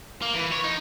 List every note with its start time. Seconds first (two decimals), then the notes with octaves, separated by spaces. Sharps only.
0.22 A#3
0.34 E3
0.52 C#5
0.64 D#4